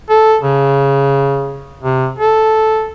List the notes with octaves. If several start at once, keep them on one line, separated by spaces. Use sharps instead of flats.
A4
C#3
C3
A4